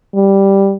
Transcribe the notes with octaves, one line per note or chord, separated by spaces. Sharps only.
G3